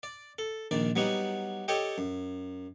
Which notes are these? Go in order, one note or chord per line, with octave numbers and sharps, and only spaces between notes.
D5
A4
A#1 D#3 D5
F#3 G3 B3 D#4 F#4
G4 A4 C#5 D#5 G5
F#2